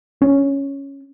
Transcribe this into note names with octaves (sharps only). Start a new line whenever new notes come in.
C#4